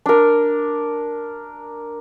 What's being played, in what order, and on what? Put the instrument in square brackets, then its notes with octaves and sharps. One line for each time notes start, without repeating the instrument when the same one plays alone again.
[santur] D4 A#4